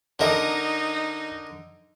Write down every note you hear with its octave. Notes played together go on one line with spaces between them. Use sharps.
D3 D#4 A4 A#4 D#5